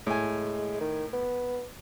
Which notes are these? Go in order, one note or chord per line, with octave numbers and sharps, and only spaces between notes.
A2 G#3 G#5
D#3
B3